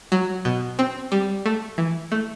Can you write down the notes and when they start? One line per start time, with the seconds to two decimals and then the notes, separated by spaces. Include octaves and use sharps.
0.12 F#3
0.45 B2
0.79 C4
1.12 G3
1.46 A3
1.78 E3
2.12 A3